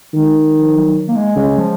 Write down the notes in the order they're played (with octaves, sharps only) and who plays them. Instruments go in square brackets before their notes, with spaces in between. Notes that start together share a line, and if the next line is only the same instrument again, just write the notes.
[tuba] D#3 [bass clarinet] G#3
[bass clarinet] F3
F#3
A#3
G#3
[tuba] C#3 [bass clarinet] G#3
[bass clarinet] F3